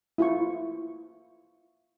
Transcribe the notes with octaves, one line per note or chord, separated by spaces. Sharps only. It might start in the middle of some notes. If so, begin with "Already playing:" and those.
E4 F4 C#6